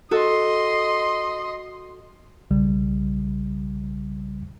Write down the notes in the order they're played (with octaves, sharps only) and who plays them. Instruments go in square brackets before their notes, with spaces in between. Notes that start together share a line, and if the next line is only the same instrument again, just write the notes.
[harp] F#4 A4 [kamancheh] D#5 C6
[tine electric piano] B1 C#3 G3